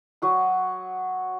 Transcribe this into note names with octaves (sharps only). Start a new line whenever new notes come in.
F#3 F#4 D#6